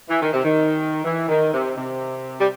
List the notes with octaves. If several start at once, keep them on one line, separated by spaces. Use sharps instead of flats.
E3
D#3
C3
D#3
E3
D#3
C3
C3
G3